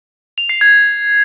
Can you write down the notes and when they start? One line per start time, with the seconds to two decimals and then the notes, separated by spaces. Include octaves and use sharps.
0.38 F7
0.49 C7
0.61 G#6